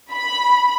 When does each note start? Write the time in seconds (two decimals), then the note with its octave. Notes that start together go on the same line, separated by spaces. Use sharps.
0.12 B5